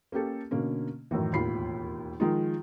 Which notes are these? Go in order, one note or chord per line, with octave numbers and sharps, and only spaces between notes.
A#3 C#4 G4 A4
B2 D3 A#3 C#4
F#2 A2 D#3 E3
E1 D#2 A2 F4 B5 C7
D#3 F3 G#3 D#4 F4